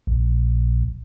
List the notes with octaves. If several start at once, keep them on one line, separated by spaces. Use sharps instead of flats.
A#1